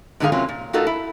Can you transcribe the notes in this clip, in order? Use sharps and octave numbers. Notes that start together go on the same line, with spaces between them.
G#2 D3 D#3 F#3 G#4 F5
C3 F#3 A#3 C4 C#4 F4
A#2
A3 D#4 F4 F#4 A4 A#4
E4